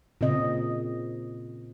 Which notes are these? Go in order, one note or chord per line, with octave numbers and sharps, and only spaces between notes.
A#2 C#3 C4 D#5